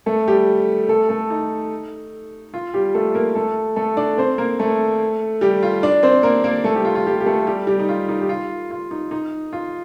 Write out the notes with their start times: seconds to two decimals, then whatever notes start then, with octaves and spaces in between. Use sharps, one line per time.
0.06 A3 A4
0.28 G3 G4
0.88 A3 A4
1.09 A3 A4
1.30 D#4
2.54 F4
2.74 G3 G4
2.94 A3 A4
3.15 A#3 A#4
3.35 A3 A4
3.76 A3 A4
3.97 D4 D5
4.18 C4 C5
4.38 A#3 A#4
4.59 A3 A4
5.41 G3 G4
5.63 F4
5.83 D4 D5
6.03 C4 C5
6.23 A#3 A#4
6.44 A#3 A#4
6.64 A3 A4
6.75 G3 G4
6.85 F4
6.95 F4
7.06 G3 G4
7.20 G4
7.26 A3 A4
7.47 G3 G4
7.67 G3 G4
7.79 D#4
7.89 F4
8.09 D#4
8.21 G4
8.29 F4
8.71 F4
8.91 D#4
9.11 D#4
9.53 F4